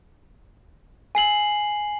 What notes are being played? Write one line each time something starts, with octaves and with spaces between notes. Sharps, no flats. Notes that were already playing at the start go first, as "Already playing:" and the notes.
G#5 C7 F#7